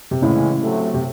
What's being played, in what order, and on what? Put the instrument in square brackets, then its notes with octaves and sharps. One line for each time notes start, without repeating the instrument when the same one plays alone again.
[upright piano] C3
[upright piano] A2 C#3 [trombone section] E3 G#3 C#4
[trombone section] C3 F#3 A3
[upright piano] C3